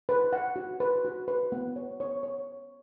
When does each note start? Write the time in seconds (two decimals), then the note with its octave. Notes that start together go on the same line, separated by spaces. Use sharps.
0.09 B4
0.33 F#5
0.56 F#4
0.80 B4
1.05 F#4
1.28 B4
1.52 B3
1.76 C#5
2.00 C#5
2.23 C#5